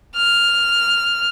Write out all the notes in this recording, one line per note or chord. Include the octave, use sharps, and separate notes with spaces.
F6